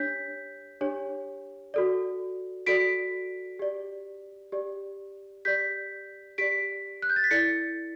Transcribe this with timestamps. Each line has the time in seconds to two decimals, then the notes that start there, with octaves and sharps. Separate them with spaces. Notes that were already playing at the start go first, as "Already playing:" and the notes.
Already playing: D4 G4 C#5 G6 B6
0.81 D4 G4 C#5
1.74 F#4 A4 D5
2.66 F#4 A4 D5 B6 D7
3.59 G4 D5
4.52 G4 D5
5.45 G4 D5 G6 B6
6.38 G4 D5 B6 D7
7.02 F#6
7.10 G6
7.16 A6
7.24 B6
7.31 E4 A4 D5 A6 C#7